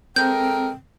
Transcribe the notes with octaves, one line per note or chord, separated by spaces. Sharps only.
G#3 C4 A4 A#4 G5 G6